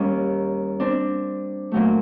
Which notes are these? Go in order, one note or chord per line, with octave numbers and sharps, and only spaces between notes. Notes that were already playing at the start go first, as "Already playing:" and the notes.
Already playing: D#2 D#3 G3 C#4
C4 D4
A#2 F#3 A3